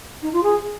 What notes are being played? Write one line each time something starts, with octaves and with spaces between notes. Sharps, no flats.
D#4
F4
G#4